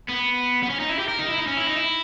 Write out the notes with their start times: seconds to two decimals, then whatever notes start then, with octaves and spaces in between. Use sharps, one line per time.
0.09 B3
0.63 B3
0.70 C#4
0.80 D#4
0.90 E4
0.99 G4
1.09 A#4
1.19 D#4
1.28 E4
1.38 D#4
1.47 C#4
1.57 E4
1.67 D#4
1.76 E4